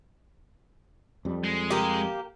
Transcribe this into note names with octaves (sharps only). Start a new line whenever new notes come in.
F2 G3
G#3
A#3 G4